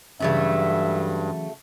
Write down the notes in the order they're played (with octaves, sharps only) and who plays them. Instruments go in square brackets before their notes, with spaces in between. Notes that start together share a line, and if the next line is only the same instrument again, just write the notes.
[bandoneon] G2 [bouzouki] C#3 A3 F#4 [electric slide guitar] E3 F#3 C#4 [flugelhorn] E5